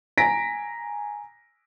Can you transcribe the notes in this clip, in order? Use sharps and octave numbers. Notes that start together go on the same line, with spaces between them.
G#5 A#5 A#6 B6 D7